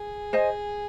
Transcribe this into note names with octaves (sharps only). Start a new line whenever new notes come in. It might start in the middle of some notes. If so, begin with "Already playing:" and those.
Already playing: G#4
C5 D#5 G#5